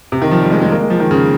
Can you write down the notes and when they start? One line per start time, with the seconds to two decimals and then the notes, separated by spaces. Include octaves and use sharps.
0.12 C3
0.22 D#3
0.31 F3
0.42 G3
0.51 G#3
0.62 G#3
0.71 A#3
0.80 G#3
0.90 F3
1.00 D#3
1.11 C#3